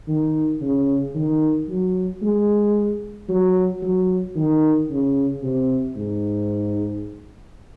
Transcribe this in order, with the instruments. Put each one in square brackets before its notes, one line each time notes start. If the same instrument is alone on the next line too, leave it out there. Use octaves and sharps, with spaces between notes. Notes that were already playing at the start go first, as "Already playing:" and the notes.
[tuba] D#3
C#3
D#3
F#3
G#3
F#3
F#3
D#3
C#3
C3
G#2